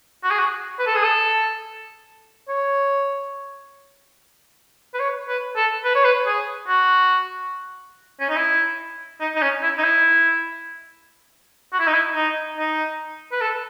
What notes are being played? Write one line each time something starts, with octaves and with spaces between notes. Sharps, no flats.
F#4
G#4
F#4
B4
A4
G#4
A4
C#5
B4
C#5
B4
A4
B4
C#5
B4
G#4
F#4
C#4
D#4
E4
D#4
D#4
C#4
E4
D#4
E4
F#4
E4
D#4
E4
D#4
D#4
B4
A4